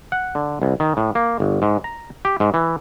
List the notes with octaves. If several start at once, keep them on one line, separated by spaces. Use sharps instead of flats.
F#5
D3
C2
D#3
A2
A#3
G1
G#2
A#5
G4
G#2
E3